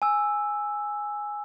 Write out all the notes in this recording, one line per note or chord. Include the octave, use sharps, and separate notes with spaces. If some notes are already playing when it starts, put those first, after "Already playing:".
G#5 E6